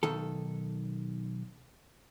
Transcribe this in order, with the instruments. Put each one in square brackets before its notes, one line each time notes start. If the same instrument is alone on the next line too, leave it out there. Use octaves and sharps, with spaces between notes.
[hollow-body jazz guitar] B1 D#3 A4